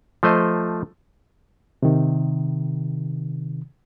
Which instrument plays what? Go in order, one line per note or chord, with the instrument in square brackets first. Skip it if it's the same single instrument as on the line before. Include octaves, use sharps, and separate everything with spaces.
[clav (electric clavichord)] F3 A3 C5 D#5
[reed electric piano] C3 D#3